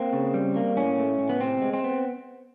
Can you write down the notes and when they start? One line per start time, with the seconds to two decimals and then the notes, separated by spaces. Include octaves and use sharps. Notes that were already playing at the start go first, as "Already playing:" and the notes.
Already playing: A#3 C4
0.13 C#3
0.34 G3
0.56 A#3
0.77 A2 C#4
0.99 A3
1.19 A2
1.29 B3
1.40 C3 C4
1.62 G#3
1.73 C4
1.84 B3